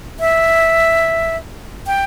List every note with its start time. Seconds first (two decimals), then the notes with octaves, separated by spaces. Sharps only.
0.20 E5
1.87 G5